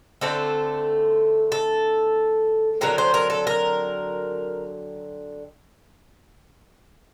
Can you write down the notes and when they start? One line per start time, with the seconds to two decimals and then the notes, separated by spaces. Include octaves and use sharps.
0.21 D3 A3 C4 A4
1.52 A4
2.81 D3 F#3 C4 A#4
2.98 C5
3.14 A#4
3.30 A4
3.47 A#4